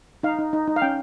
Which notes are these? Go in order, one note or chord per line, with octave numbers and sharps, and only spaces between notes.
D#4 F5
D#4
D#4
D#4
F5
C#4 G5